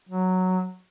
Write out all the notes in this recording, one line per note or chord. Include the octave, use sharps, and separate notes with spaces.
F#3